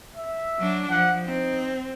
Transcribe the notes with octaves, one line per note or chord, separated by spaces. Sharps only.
E5
F#3 D4
F3 F#5
C4 D#4